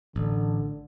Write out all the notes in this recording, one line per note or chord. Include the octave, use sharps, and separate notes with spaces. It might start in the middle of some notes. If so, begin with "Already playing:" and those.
A1 D3